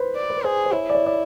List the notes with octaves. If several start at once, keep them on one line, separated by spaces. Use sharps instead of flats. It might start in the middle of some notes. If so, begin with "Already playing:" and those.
Already playing: B4 C5
D5
C5
B4
G#4 C5
C5
E4 C#5
D5
C#5
D5